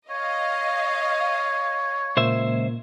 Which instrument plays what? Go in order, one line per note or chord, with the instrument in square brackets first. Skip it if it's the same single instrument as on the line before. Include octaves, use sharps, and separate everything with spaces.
[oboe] C#5 [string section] D#5 F5
[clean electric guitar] C#2 C5 E5 [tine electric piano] A#2 A#3